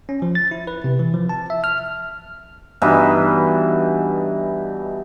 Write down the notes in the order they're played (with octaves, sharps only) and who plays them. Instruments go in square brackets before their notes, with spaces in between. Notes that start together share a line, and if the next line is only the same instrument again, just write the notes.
[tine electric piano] C#4
F3
A6
E4
B4
C3
E3
F3
A5
E5
F6
[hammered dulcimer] G2 B2 E3 D#4